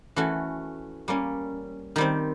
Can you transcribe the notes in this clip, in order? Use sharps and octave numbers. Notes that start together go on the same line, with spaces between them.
E3 A3 C#4 F#4
G3 A#3 C#4
D#3 G3 C4